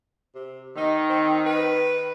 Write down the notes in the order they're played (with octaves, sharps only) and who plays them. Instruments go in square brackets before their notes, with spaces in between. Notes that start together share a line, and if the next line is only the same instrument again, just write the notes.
[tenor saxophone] C3
[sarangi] D#3 [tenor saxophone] D#4
[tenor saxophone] C4
B4